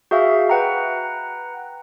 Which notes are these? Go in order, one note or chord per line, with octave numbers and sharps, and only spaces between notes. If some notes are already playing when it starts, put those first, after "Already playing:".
F#4 G#4 E5 F5
B4 F#5 G5 A#5